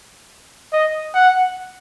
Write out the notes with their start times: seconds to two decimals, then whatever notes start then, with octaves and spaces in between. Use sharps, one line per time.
0.73 D#5
1.14 F#5